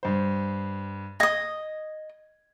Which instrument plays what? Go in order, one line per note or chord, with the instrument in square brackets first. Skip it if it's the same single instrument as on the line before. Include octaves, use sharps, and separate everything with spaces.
[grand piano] G2 C5
[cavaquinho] D#5 D#6 [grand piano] G#6